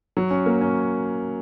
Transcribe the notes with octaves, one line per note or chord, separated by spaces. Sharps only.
F#3
C#4
A#3
C#4